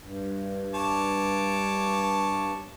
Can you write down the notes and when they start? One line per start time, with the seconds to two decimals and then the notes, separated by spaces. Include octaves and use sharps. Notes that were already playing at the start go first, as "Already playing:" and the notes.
0.03 G2
0.74 C#5 A5 D6